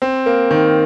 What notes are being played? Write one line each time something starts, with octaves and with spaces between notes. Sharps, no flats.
C4
A#3
D#3